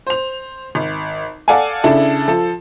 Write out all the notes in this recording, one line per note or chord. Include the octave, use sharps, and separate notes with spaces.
C5 F7
G#1
A4 D5 F5 F#5 G#5
C#3 D4 E4 A4
F3 A4